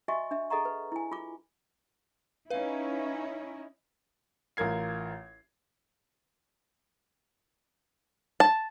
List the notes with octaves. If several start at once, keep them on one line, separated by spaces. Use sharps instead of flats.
F#4 D#5 E5 G#5 C#6
D4 E5
G#4 A4 D#5 F#5 A#5 C#6
B4
E4 G#5
F4 D6
C#4 D#4 E4 B4 F5
A1 F4 A#4 G#6 C7
A5